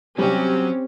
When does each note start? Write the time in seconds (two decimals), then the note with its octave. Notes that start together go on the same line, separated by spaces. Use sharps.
0.18 C3 F#3 G3 C4 C#4 G4